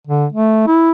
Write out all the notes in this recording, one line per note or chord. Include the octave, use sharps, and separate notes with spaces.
D3
A3
E4